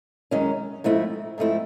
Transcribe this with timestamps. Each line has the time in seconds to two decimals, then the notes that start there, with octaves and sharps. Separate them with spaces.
0.31 F#2 D#3 G#3 C#4
0.84 G#2 F3 A3 C4 E4
1.38 G#2 F3 A3 C4 E4